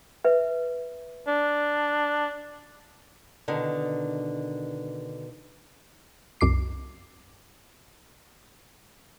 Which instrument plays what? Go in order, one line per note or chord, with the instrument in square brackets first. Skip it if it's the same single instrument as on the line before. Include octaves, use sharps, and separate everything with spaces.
[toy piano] B4 E5
[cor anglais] D4
[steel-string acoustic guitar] B2 D3 D#3
[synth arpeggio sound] C2 F#2 D6 C7